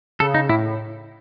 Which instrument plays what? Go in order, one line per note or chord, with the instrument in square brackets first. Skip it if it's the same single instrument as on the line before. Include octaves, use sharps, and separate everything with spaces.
[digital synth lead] C#3 [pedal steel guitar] A4
[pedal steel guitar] D#4
[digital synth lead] A2 [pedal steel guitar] E4